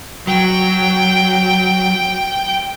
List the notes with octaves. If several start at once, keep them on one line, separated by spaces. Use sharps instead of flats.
F#3 G5